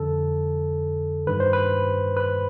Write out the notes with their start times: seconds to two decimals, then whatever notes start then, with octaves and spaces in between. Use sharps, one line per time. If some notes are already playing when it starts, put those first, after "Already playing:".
Already playing: F2 D3 F3 A4
1.27 G2 D#3 B4
1.40 C5
1.53 B4
2.17 B4